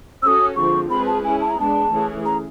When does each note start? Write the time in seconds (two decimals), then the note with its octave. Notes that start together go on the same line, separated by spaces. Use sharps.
0.22 C#4 F#4 A4 D#6 E6
0.56 D3 F3 G#3 C4 C#6
0.90 G#3 C4 F4 G#4 B4 B5
1.07 A5
1.24 C#4 E4 G#4 G#5
1.41 A5
1.50 A#5
1.58 G#3 B3 D4 A5
1.92 E3 A3 C#4 E4 G#4
2.26 A#5